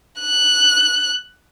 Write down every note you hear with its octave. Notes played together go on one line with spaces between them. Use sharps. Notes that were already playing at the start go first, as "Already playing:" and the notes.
F#6